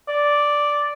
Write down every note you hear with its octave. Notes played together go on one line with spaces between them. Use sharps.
D5